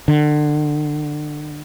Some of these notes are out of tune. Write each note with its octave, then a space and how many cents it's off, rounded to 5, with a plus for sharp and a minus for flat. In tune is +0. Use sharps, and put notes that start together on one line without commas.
D3 +30